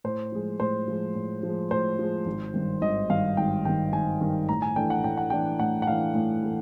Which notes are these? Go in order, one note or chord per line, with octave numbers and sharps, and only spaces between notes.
A2 C5
F3 G#3
A2 C5
F3 G#3
A2
F3 G#3
A2 C5
F3 G#3
G#1
G2 D#3
G#1 D#5
G2 D#3 F5
G#1 G5
G2 D#3 G5
G#1 G#5
G2 D#3
A2 A#5
G#5
E3 A3 D4 G5
F#5
A2 G5
F#5
E3 A3 D4 G5
A2 F#5
F#5
E3 A3 D4 F5
A2
E3 A3